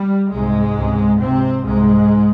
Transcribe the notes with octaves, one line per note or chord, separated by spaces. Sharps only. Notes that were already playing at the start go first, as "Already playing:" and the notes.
Already playing: G3
C2 G#2 C3 G#3
C#2 C3
G#1 G#2 C3 C4
C2 G#2 C3 G#3